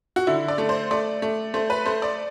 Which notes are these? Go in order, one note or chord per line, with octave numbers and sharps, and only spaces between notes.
F#4
D3 E4
D5
A3
C5
A3 D5
A3
A3 C5
B4
A3 C5
D5